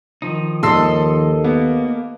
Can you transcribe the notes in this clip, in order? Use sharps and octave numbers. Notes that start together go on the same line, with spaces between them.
D#3 F3 D#4
D#2 A4 D#5 C6 E6 C7
A#3 B3